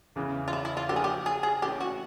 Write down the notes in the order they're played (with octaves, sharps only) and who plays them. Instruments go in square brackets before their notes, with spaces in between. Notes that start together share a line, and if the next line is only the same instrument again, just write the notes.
[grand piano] E2 C#3 E3
[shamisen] F4
E4
E4
F4
[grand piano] F3 A#3 D4 F#4 A4 [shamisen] G4
[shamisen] G#4
G4
G#4
G#4
[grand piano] E3 A3 C#4 [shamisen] G4
[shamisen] F#4